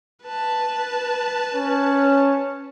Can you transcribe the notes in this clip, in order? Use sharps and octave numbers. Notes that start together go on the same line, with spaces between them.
B4 A5
C#4